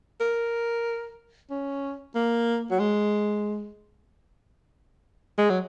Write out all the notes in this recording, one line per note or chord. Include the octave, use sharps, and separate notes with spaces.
A#4
C#4
A#3
F#3
G#3
G#3
F#3